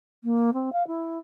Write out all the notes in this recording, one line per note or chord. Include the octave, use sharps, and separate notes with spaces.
A#3
C4
F5
E4